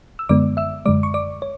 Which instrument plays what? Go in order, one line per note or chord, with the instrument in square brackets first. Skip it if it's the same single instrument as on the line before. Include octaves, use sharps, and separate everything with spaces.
[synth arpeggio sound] E6
F#2 D3 G#3 B3 D5 D6
E5 E6
F#2 D3 G#3 D5 D6
C#6
D5 D6
C#5